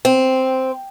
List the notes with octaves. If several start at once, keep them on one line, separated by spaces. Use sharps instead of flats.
C4